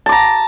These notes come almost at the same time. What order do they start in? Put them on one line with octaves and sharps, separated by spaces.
A5 D6 A#5